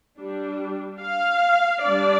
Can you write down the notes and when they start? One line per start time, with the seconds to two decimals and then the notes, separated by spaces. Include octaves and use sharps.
0.18 G3 D4
1.02 F5
1.83 G3 D4 D5